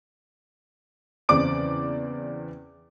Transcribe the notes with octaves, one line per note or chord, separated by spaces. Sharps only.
E2 C#3 C4 D5 D6 D7